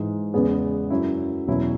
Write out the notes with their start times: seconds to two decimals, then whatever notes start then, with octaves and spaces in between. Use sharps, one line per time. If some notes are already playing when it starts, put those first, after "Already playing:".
Already playing: G#2 E3 G#3
0.34 E2 C#3 G#3 B3 G#4
0.90 F#2 F#3 C#4 E4
1.48 E2 B2 F#3 C#4 E4